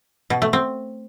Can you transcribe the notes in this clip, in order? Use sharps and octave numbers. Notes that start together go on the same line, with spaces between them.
B2
A3
C4